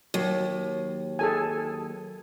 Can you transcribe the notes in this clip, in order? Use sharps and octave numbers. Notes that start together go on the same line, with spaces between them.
D#2 F#3
G#4 A4 G#5